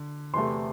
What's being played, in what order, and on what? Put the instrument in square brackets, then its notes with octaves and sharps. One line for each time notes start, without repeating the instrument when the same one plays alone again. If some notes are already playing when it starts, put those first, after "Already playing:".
Already playing: [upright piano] D3
E2 C3 A3 C6